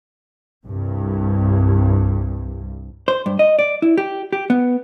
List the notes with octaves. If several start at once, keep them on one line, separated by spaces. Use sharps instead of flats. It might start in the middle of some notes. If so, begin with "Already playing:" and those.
C2 G2
C5
G2
D#5
D5
E4
G4
G4
B3